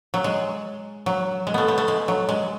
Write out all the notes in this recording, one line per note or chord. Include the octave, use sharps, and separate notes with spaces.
F#3
G#3
F#3
G#3
A3 B3
B3
A3
G#3
F#3
G#3